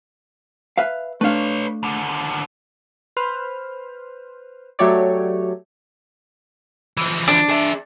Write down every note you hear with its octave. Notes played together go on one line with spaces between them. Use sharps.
B4 E5 F5
A3 D4 B4 C#5 F5
D#2 D3
B4 C5 F6
F#3 A3 F#4 G4 C#5 D5
E3 F3
D4
G#4 E5